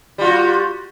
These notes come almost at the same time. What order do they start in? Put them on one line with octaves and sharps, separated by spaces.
G3 F4 F#4